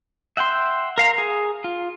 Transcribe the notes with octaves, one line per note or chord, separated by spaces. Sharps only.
E5 F#5 G5 C6
A#4 F5 A#5
G#4
F4